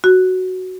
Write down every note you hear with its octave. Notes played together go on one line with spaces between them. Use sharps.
F#4